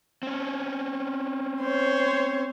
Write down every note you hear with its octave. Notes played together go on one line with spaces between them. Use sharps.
C4 C#4
C5 C#5